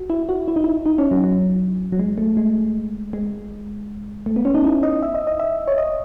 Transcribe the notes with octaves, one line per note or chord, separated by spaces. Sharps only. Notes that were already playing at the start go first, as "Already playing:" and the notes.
Already playing: F#4
E4
F#4
E4
D#4
E4
D#4
C#4
F#3
F#3
F#3
G#3
A3
G#3
G#3
A3
B3
C#4
D#4
E4
D#5
E5
D#5
D#5
E5
C#5
D#5